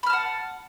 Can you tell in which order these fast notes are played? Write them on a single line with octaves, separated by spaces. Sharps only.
B5 F6 A5 F#5